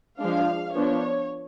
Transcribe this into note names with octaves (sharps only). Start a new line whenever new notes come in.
F3 G#3 D4 F5
F3 B3 D4 C#5